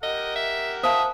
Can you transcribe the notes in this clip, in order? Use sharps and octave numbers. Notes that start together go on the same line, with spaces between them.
G4 A#4 D#5 F#5
E5
C5 E5 F5 A5 D#6